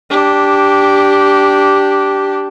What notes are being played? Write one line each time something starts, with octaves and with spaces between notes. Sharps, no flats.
D4 G4